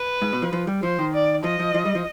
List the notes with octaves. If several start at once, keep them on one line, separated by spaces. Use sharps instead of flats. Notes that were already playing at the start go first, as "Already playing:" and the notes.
Already playing: B4
G#2
B2
F3
F3
G3
F3 C5
D#3
D5
F3 D#5
F3
F3
G3
F3